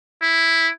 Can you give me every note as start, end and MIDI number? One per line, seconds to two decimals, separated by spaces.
0.23 0.68 64